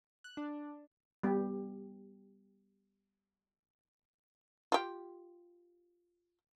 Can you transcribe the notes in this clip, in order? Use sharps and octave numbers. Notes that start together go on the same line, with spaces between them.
F#6
D4
G3 B3 G4
F4 G4